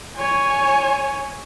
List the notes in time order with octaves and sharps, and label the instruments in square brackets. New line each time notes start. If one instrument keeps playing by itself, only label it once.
[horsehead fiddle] C#5 G#5